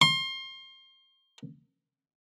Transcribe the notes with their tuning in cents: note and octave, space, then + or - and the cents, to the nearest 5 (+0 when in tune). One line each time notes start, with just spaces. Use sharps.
C6 +30